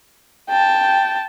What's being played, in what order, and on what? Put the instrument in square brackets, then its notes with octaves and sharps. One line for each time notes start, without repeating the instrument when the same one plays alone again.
[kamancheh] G5 A5